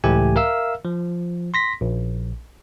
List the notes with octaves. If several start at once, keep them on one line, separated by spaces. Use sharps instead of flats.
C#2 A2 E3 A3 G4 G#5
A#4 E5 F5 E6
F3
C6 A#6 B6
A#1